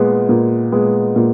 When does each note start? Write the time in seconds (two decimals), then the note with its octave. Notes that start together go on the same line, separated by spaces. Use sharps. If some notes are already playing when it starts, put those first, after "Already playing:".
Already playing: A#2 G#3 B3
0.29 A#2
0.72 G#3 B3
1.16 A#2